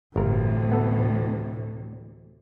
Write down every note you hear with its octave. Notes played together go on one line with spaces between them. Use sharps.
G1 D2 A2 C3 E3 A#4
B3 A4